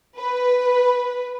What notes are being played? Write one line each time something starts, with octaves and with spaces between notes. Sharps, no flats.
B4